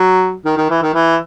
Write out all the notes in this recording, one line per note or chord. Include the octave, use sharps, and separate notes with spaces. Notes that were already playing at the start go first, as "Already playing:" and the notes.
Already playing: F#3
D#3
D#3
E3
D#3
E3